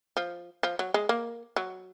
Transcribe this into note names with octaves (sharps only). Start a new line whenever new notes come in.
F3
F3
F#3
G#3
A#3
F#3